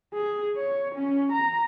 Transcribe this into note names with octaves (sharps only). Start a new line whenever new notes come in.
G#4
C#5
C#4
A#5